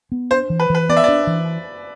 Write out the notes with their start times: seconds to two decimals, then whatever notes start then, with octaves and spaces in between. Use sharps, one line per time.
0.12 B3
0.31 D4 C5
0.50 E3
0.60 B4
0.70 E3 B4
0.89 B3 D5
0.97 E5
1.04 D4 D5
1.27 E3